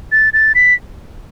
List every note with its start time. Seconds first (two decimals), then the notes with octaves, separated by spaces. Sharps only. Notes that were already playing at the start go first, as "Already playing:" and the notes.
0.12 A6
0.33 A6
0.55 B6